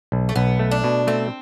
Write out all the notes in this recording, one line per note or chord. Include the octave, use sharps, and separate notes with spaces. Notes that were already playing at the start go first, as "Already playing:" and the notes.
B1
A3
B1 B3
A3
D4
B2
A3 C4